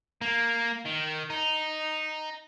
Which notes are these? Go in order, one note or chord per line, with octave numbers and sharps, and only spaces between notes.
A#3
D#3
D#4